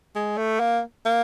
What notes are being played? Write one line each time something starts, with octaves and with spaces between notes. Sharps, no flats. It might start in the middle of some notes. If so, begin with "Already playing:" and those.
G#3
A3
A#3
A#3